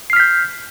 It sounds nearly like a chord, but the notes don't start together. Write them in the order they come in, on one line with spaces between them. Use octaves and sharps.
C7 F6 B6 G6